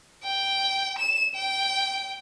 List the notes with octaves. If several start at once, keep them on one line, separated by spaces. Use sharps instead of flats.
G5
E7
G5